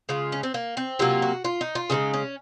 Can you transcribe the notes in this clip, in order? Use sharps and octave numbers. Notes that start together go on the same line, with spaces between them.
C#3 G#3 F4
C#4
C4
A#3
C4
C3 F#3 A#3 F4
F#4
F4
D#4
F4
C#3 F3 G#3 D#4
C#4